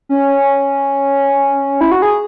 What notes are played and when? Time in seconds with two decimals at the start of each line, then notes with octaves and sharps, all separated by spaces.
0.09 C#4
1.81 E4
1.92 F#4
2.02 G#4